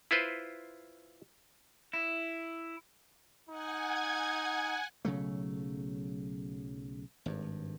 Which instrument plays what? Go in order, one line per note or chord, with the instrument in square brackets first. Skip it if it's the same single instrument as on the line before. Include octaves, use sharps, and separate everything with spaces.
[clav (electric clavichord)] E4 F4 B4 C5
[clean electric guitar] E4
[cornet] D#4 [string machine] F#5 G#5 G#6
[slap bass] B1 C#3 F#3 A3
G#1 G2